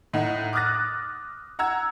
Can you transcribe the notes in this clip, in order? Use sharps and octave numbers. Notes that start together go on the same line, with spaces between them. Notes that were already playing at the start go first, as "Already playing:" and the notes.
A2 D#4 F#5
D6 D#6 F6 F#6 A6 A#6
F#5 A#5 E6 G#6